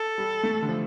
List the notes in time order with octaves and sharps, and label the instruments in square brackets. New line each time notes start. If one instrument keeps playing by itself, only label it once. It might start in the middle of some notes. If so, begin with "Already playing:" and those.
Already playing: [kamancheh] A4
[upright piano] G3
A3
D3
F3